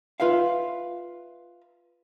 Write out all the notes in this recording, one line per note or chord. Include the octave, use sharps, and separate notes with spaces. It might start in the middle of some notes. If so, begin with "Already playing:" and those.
F4 B4 E5 F5